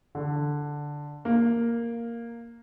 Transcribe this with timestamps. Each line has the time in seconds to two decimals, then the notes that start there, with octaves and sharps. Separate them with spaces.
0.15 D3
1.25 A#3